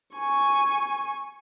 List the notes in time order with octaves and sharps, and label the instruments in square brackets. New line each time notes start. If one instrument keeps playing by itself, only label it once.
[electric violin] G#5 C#6